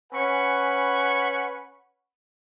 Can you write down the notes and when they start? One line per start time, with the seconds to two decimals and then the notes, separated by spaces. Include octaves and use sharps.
0.12 C#4 B4 F#5 G#5 B5 C#6